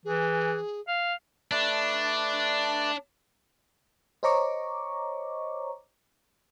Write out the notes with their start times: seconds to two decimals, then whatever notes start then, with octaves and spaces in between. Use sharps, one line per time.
0.05 E3 G#4
0.87 F5
1.52 A3 D4 B4 D5
4.23 C5 C#5 D#5 A#5 C#6 D6